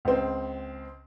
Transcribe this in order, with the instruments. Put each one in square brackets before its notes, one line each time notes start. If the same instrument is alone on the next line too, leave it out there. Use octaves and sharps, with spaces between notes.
[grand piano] C#2 C4